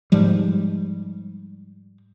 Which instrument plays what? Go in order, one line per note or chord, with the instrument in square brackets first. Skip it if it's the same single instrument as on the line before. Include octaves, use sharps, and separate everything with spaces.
[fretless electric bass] G#2 F3 G3 G#3